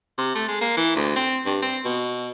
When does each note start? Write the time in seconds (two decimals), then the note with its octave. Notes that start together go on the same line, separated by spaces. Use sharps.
0.18 C3
0.35 A3
0.48 G#3
0.61 A#3
0.77 E3
0.96 D2
1.16 C4
1.46 G2
1.62 C4
1.85 B2